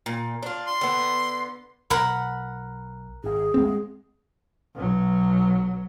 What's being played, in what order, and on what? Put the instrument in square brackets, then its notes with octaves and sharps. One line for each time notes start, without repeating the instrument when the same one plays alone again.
[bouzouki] A#2
D4 F4
[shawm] C6
[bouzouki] D3 B3
[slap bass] B1 [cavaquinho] A#4 F#5 B5
[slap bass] G#1 G#2 [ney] G#4
[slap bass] D1 D#2 A3 [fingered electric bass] G#3 C4
[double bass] B1 F#3